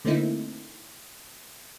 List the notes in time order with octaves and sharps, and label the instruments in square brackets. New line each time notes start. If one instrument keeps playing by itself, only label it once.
[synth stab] D3 A3 A#3 C4 D#4 E4